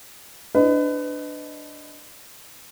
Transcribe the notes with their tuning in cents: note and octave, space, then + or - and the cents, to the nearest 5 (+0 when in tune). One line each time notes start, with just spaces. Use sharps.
D4 +0 B4 +30 D#5 +0